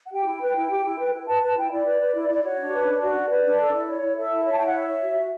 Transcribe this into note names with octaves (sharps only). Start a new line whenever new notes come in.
F#5
G4 G5
E4
B4
E4
G4
E4
B4
E4
B4 A5
B4 A5
E4 G5
E4 D5
B4
B4
E4
E4
D5
F#4 C#5
D4
B4
D4
C#5
F#4 D5
D4
B4
D4
A4
E4
C#5
E4
A4 E5
E4
C#5
A5
E4 G5
F#5
C#5 E5
C#5
F#4
F#4